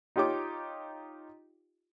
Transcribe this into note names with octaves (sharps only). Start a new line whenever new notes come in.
D#4 F4 G4 C#5 D6